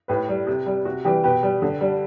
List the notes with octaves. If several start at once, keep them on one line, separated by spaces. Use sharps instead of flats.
A2 G4 B4
G3
C3
G3
C3 F#4
E3 G3 G4
B2 G4 B4
G3
D3
G3